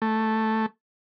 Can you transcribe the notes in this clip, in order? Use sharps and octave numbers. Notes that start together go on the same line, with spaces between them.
A3